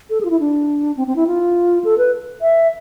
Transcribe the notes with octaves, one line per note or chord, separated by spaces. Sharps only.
A4
G#4
F4
E4
D4
C4
C4
E4
F4
A4
B4
E5